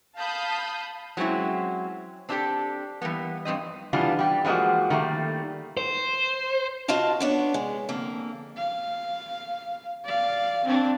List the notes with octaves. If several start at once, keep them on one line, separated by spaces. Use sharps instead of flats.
F5 A5 B5 D#6 G6
F#3 G#3 C4 C#4 E4
C4 D4 E4 F4 G4 A4
E3 G3 A#3 B3
G2 E3 C4 D#5
E3 G3 B3 D4 F4
G3 G4
E3 F3 G#3 A#3 F#4
D#3 G3 A3 A#3
C5
F4 F#4 D#5 F5 A5
B3 D4 C#5
G#3
F2 D3 A#3
F5
D5 F5
C4 D4